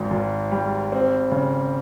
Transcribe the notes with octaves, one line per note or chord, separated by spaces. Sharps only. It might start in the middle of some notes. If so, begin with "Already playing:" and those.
Already playing: G#1 G#2
G#1
G3
C4
C#3